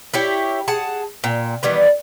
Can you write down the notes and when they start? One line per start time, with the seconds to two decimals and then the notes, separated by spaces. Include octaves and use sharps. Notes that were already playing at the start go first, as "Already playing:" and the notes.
0.14 E4 G4 C#5
0.68 G#4 F#5 A5
1.24 A#2 G5
1.63 D#3 E3 G3 B3